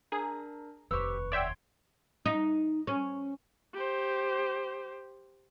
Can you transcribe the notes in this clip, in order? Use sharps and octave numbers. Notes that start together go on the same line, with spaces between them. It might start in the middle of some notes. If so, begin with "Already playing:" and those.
D4 G#4 A#4 A#5
F1 D#2 G4 B4 C5 C#6 E6
C#5 D5 E5 F#5 G5 C6 G#6 D7
D#4
C#4
G4 C5